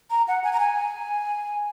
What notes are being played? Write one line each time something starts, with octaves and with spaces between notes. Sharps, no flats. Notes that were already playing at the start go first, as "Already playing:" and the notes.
A#5
F#5
G#5
A#5
G#5